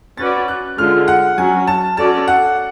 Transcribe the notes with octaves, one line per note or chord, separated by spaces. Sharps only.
C#4 F#4 B4 D5 A6
F#6
D3 G#3 C#4 F4 F6
F#5
F#3 C#4 F#4 G#5
A5
C#4 F#4 A4 D5 A5
F#5